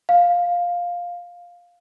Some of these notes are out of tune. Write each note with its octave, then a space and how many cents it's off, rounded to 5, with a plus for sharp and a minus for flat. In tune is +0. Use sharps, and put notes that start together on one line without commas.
F5 +10